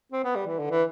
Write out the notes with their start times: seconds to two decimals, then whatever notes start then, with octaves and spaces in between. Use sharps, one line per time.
0.12 C4
0.24 B3
0.36 G3
0.47 E3
0.59 D3
0.71 E3